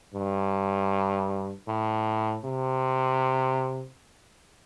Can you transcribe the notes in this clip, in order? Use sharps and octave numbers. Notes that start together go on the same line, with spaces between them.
G2
A2
C3